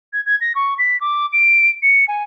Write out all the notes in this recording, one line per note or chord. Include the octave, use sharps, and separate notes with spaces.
G#6
G#6
A#6
C#6
B6
D6
D7
C#7
G#5